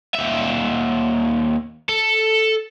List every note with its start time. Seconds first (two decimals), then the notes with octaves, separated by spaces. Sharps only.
0.14 D#2 E5
1.89 A4